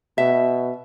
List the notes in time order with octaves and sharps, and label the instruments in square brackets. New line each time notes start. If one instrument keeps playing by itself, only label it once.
[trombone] B2 [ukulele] E5